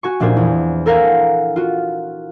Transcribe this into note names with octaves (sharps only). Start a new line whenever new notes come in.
F#4 G#5 C#6
F1 A#2 D4 C5 G#5
E2
A4 A#4 F5 F#5 G#5
F4 F#4